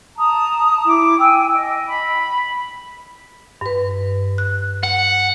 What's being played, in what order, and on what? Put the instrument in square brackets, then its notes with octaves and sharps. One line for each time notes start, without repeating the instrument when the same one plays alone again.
[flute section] A5 A#5 D#6
E4 D6
G5 G#5 E6
D#5
B5
[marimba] G2 B4
F#6
[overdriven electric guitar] F#5